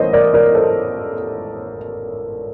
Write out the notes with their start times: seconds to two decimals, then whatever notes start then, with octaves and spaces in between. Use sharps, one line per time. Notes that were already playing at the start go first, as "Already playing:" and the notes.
Already playing: A1 A#4 C5 D#5
0.13 A#4 D5
0.34 A#4 D5
0.55 A4 C5